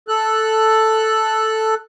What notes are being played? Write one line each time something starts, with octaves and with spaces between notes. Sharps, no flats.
A4 F#6